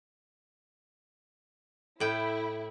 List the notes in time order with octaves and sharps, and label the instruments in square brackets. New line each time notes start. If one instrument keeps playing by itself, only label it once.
[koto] A2 G5 [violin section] E4